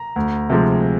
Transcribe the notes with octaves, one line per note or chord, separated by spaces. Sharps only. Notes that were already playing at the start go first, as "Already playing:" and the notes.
Already playing: A#5
D2
C3 F3 G#3